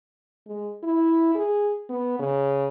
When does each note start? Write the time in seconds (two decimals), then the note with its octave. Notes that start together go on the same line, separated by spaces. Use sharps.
0.47 G#3
0.83 E4
1.35 G#4
1.89 B3
2.19 C#3